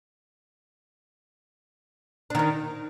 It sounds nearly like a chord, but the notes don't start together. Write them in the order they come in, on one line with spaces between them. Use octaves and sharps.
D4 D#3 D#4